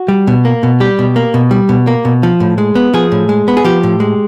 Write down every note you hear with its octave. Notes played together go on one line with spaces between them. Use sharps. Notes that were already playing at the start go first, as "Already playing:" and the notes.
Already playing: F#4
G3
B2
A#3
B2
G3 G4
B2
A#3
B2
G3
B2
A#3
B2
F3
A2
G#3
B3
F3 G#4
A2
G#3
B3
G#4
F3 G4
A2
G#3